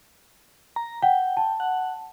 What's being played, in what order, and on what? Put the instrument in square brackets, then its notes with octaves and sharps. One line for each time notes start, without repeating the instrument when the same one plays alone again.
[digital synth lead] A#5
[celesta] F#5 [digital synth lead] G5
[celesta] A5
[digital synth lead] F#5